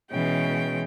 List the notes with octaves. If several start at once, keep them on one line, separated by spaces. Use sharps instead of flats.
B2 E3 G#3 C#4 G5